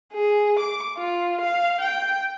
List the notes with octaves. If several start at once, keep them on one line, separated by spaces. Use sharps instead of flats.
G#4
D6
F4
F5
G5